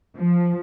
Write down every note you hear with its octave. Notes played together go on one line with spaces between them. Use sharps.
F3